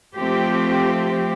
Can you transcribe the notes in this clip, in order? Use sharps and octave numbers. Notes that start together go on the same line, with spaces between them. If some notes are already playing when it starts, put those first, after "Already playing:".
F3 A3 C4 G4